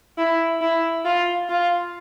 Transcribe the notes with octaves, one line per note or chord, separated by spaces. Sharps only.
E4
E4
F4
F4